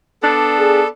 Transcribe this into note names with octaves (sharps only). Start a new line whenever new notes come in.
B3 D4 A4
G#4